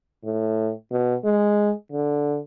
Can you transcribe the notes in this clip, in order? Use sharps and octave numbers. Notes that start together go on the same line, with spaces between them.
A2
B2
G#3
D3